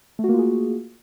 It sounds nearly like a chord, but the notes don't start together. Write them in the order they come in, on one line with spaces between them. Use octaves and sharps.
A3 F#4 A#3 F4 G#4